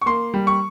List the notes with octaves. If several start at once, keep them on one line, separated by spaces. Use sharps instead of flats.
C#6
A#3 C6
G3
C#6